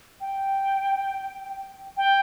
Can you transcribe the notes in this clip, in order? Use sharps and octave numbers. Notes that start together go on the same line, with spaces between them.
G5
G5